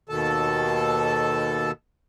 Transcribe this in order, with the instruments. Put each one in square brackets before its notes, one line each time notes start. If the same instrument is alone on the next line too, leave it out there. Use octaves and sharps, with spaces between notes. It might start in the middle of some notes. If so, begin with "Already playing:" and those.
[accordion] D#2 B2 D#3 A4 A5